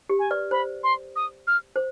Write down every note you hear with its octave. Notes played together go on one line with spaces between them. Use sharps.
G4
G#5
B4 D5
C5 B5
C6
D#6
F6
C5